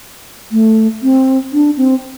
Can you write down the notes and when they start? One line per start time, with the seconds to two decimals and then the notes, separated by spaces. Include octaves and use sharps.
0.52 A3
1.03 C4
1.53 D4
1.77 C4